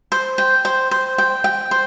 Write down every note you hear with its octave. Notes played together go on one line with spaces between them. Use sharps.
C5
G5
C5
C5
G5
G5
C5